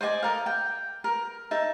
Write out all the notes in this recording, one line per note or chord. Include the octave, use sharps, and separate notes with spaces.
C5 D5 D#5 G#5
A4 A#4 F5
G5
A#4
D#4 E5 A5